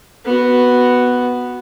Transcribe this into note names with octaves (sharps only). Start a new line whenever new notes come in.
B3 F#4